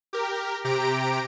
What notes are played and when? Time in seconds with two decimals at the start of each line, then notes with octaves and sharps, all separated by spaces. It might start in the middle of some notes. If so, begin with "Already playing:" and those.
0.13 G4 A#4
0.64 C3 G4 A#5 D7